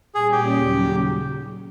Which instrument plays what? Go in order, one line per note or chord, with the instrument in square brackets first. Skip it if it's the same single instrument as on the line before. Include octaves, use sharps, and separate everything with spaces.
[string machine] A#2 G3 A#3 C#4 [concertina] G#4
[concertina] G4
[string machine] D#2 C#3 F#3